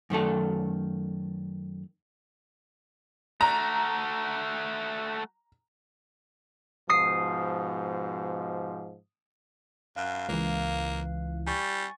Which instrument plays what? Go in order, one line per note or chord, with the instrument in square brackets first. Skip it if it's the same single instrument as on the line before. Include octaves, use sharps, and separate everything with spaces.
[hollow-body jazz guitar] F#2 D#3 A3 A4
[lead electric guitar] A3 F#4 [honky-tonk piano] A#5
[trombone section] G#2 B2 F3 [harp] D#6 C7
[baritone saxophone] F#2 [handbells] F5 F#6
[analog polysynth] C#2 E3 [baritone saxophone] A#3
[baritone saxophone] G3 [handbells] G#5 C#6 A6